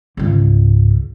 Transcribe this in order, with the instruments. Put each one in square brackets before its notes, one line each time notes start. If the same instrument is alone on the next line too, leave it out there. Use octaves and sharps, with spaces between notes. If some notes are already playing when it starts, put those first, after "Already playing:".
[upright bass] C#2 G#2